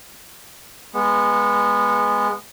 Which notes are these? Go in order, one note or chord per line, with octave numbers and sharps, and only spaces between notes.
G#3 B3